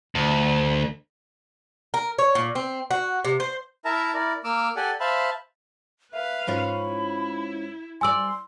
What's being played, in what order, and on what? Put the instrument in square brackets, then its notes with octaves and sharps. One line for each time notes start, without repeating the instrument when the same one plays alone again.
[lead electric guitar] D2
[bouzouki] A#4
C#5
A#2
C4
F#4
C3
C5
[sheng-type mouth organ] E4 A#4 E5 A5 A#5
E4 A#4 D5
A#3 D6 E6 F6
G4 A4 D5 F#5 G#5
C5 E5 F5 A5 B5
[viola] B4 F5 [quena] E5
[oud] G#2 C#4 F4 [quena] B5
[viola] E4
[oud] G3 D5 [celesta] G#5 E6 [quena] C6